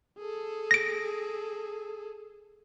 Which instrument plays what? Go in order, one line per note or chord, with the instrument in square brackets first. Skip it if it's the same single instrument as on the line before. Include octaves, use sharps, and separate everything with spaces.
[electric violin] G#4 A4
[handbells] A#6 D7